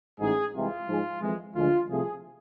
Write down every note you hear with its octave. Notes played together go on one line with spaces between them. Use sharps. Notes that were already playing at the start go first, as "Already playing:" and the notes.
A1 G#2 G#3 G#4
C2 C3 E3 G#3 F4
G#2 F3 G#3
F2 E3 G#3
D2 D3 F3 G#3 F4
C2 C3 F3 A3 G#4